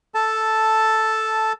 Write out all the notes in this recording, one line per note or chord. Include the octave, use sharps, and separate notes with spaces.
A4 A5